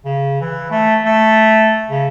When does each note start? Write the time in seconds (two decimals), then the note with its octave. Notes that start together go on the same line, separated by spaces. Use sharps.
0.05 C#3
0.41 E3
0.71 A3
1.06 A3
1.90 C#3